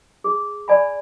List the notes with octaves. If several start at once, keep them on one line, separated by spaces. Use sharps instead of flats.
G#4
D5 G#5 B5